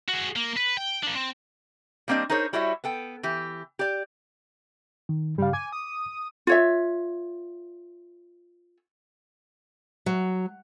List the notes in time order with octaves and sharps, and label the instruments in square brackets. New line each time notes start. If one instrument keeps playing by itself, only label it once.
[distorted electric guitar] F#4 G#4
A#3
B4
G5
A#3 D4
C4
[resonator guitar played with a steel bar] G3 A#3 C4 D4 D#5
D#4 G#4 A#4 C5 C#5
G3 E4 F#4 C#5 D#5 E5
B3 A4 G5
E3 G4
G4 D5
[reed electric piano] D#3
[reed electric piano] G2 C#3 F5 [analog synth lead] G3
[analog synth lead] G#5 [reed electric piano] D6
[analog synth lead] D#6
[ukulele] F4 C#5 E5
[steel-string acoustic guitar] F#3